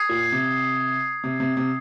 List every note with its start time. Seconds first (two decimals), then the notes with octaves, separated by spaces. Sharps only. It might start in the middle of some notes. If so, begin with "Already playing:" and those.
Already playing: D#6 G#6 C7
0.09 A#2
0.32 C3
1.23 C3
1.40 C3
1.57 C3